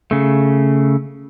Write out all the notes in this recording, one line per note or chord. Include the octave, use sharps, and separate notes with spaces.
C#3 A3